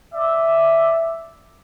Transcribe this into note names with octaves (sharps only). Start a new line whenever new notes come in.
D5 E5